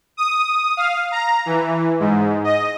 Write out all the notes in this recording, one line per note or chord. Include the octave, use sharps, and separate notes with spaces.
D#6
F5
A#5
E3
G#2
D#5